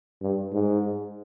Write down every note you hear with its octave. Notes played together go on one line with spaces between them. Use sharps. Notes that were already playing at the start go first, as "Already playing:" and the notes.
G2
G#2